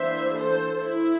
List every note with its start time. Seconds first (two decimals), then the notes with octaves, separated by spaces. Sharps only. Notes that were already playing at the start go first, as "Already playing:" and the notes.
Already playing: E3 A#3 D4 C5 E5
0.36 A4 C5
0.81 E4